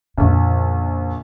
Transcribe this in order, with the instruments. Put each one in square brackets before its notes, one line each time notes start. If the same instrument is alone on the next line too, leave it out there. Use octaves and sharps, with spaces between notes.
[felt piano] A#1 [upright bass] F2 C#3